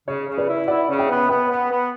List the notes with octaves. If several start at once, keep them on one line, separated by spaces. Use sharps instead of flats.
C#3 C#5
C#3
B4 D5
E4
E4 D5 F#5
C#3
E5 G5
B3
B3 G5 B5
B3
B3